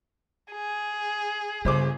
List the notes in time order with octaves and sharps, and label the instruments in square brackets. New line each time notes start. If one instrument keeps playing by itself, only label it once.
[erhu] G#4
[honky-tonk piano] G1 C5 D6 [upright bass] C#3